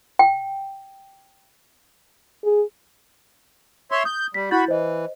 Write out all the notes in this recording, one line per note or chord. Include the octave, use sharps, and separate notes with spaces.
G5
G#4
C#5 E5 C6
D#6 G6
G3 B6
E4 F#4 B5 G6 A6
E3 C5 D#5